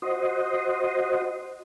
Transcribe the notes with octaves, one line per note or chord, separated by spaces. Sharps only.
F#4 C5 D#5